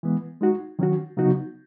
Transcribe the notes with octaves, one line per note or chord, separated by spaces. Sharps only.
E3 G#3 B3
G#3 D#4 F#4
D#3 F#3 C#4 F#4
C#3 F#3 B3 D#4 F#4